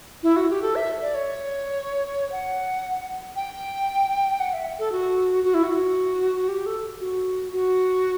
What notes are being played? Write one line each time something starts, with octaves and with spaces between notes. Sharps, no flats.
E4
F#4
G4
A4
E5
D5
C#5
F#5
G5
F#5
E5
A4
F#4
F#4
E4
F#4
G4
A4
F#4
F#4